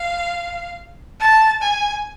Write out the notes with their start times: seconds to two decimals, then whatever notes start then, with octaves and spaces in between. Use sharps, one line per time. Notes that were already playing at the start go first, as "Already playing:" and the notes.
Already playing: F5
1.20 A5
1.62 G#5